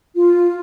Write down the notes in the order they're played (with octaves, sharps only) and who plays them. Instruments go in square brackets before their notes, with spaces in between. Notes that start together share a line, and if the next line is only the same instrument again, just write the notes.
[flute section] F4